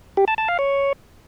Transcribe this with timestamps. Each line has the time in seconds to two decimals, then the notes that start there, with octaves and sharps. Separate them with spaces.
0.17 G4
0.28 A5
0.38 A5
0.48 F5
0.59 C#5